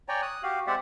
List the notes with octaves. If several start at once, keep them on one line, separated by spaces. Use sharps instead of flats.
C#5 D5 G5 G#5 A#5
D#6 F#6
F#4 G4 F5
G#3 C4 G4 D5 E5 F#5